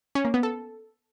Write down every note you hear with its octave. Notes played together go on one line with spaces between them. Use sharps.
C#4
A#3
B3
A4